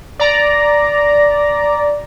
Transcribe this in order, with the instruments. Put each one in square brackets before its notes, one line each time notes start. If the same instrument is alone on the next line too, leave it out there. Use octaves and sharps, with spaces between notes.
[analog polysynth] D5 A#5